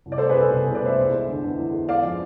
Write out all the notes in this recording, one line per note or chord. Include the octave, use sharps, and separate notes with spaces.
C2
D5
A3 A4 C5
G#4 B4
B2 A4
C2 G#4
C2
B4 D5
A3 C5 E5
E2
G#3
D3
E2
E2
G#3
G#3 D5 F5
F3